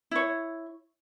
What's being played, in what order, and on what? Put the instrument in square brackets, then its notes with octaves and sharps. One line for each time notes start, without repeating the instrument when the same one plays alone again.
[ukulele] E4 C#5